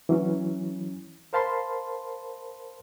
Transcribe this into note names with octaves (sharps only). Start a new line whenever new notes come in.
E3 F#3 C#4
A#4 C5 F5 A5 B5 C6